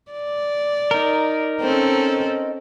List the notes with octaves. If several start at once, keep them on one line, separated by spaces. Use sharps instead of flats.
D5
D#4 A#4
C4 C#4 A4